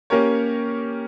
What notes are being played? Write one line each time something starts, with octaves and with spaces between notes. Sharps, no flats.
A#3 C#4 G4 A#4 C#5